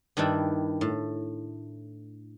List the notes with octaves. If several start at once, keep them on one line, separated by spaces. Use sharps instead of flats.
G2 D#3 G3 D4 E4
A2